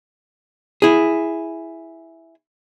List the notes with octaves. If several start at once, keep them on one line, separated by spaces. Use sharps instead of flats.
E4 G#4